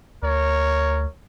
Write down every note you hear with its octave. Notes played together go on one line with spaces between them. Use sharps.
D2 A#4 C#5